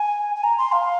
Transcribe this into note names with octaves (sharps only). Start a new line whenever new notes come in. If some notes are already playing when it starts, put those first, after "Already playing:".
Already playing: G#5
G#5
A#5
C6
F5